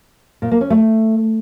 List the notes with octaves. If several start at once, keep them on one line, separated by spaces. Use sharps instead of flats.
A#2
A#3
C#4
A3